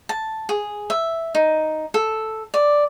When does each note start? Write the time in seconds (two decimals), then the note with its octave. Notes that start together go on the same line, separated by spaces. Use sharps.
0.09 A5
0.49 G#4
0.90 E5
1.35 D#4
1.94 A4
2.54 D5